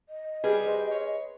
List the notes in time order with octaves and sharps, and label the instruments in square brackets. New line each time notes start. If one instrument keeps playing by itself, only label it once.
[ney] D#5
[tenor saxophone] G3 [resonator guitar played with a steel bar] G#4 [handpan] B4
[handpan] C5
[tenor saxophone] C#5